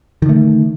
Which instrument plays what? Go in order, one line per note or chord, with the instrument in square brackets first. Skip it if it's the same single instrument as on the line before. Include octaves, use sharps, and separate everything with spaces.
[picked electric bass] D#3
D3
A3